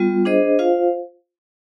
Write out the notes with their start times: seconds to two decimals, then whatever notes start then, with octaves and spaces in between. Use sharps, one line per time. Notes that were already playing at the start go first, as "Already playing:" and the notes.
Already playing: G3 B3 F4
0.25 D4 G#4 C5 D#5
0.59 F4 C5 F5